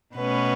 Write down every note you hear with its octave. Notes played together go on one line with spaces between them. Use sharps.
B2 A3 B3 C#4 B4